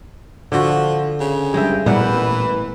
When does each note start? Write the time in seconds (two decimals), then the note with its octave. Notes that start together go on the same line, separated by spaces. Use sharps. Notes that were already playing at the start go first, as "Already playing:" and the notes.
0.52 D3 F3 F#4
1.20 C#3
1.54 G2 G#3 E5 G5
1.86 A1 A#2 E3 G3 B3 A#4 B4 F#5